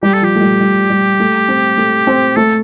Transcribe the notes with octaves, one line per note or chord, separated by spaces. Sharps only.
G3 G4
A4
F3 G4
A3
G3
G3
G3
A3
C4
A3
C4
A3 A4